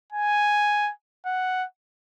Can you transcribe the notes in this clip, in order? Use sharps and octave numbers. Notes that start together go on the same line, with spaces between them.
G#5
F#5